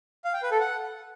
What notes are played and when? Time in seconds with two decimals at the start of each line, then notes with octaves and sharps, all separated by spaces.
0.25 F5
0.34 G5
0.42 B4
0.51 A4
0.60 F#5